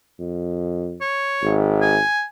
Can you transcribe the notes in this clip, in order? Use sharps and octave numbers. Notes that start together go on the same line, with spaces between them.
F2
C#5
G#1
G#5